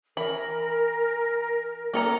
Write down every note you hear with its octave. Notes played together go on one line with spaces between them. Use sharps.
E3 A#4 B5
A#3 A4 A#5